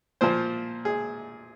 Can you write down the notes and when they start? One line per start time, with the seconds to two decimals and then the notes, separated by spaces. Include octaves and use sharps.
0.21 A#2 F3 C5
0.85 G#4